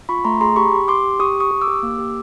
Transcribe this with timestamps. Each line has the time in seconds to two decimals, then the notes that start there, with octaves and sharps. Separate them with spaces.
0.09 F4 B5 C#6
0.25 A3 A#5 C6
0.41 G#4 A#5 C6
0.56 G4 B5 C#6
0.72 G4
0.88 G4 C6 D6
1.04 G4
1.20 G4 C#6 D#6
1.36 G4 C#6 D#6
1.51 G4
1.61 D6 E6
1.68 G4
1.83 A#3
1.99 G4